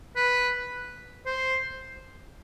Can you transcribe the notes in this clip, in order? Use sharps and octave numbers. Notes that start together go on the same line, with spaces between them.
B4
C5